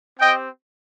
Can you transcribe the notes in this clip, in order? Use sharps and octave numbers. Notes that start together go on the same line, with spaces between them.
C4 G4 D#5 G5